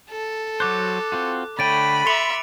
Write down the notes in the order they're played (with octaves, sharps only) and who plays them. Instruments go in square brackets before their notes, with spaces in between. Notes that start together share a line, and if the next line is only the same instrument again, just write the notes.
[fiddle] A4
[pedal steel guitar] F#3 F#4 C5 [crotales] D6 F#6
[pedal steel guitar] C4 F4 F#4
[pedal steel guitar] D3 C#5 G5 [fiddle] A3 [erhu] B5 [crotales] A6 D7 D#7
[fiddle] E5 [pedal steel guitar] C6 D6 [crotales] C#7 F7 F#7